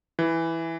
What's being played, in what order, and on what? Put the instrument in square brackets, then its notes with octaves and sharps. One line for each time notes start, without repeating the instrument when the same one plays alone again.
[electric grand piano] E3